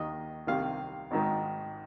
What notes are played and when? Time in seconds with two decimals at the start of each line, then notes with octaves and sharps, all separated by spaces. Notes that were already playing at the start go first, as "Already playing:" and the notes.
Already playing: D#2 D#3 D#5
0.47 C2 C3 D#3 F5
1.11 G#1 G#2 D#3